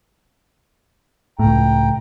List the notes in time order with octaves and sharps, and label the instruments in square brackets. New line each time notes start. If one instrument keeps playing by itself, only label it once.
[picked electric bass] C#2 A2 [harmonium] G5 A#5